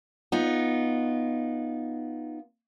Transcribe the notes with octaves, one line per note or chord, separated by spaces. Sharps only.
B3 D#4 F4